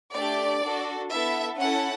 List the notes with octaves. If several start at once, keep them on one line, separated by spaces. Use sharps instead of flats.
A3 D4 G4 D5
D4 F#4 A4
B3 E4 A4 E5
C#4 E4 A4 F#5